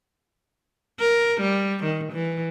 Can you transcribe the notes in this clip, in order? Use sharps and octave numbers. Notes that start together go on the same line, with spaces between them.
A#4
G3
D#3
E3